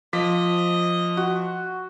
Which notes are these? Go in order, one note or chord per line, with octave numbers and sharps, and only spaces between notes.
F3 D#5 D6 B6
F#4